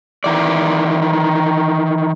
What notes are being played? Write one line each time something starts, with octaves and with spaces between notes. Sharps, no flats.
D#3 E3 D5